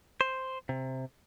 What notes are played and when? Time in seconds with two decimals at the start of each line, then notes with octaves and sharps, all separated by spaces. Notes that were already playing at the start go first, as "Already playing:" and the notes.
0.21 C5
0.69 C3